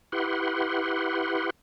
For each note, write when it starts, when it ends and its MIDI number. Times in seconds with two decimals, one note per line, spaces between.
0.12 1.50 64
0.12 1.50 67
0.12 1.50 71
0.12 1.50 78
0.12 1.50 84